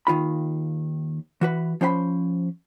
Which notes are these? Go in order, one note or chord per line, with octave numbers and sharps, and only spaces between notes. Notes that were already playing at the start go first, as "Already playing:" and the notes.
D#2 D#3 F4 B5
E3 F#4 B4
F3 C#4 C5 G5 B5